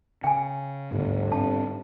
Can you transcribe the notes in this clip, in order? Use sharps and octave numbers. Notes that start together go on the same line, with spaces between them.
C#3 G5 G#5
G1 D2 G#2 B3
G#2 C4 D4 A5